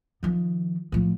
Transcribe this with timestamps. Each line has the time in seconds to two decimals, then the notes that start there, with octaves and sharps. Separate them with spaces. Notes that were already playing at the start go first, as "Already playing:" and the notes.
0.23 D#3 F3
0.92 A2 F3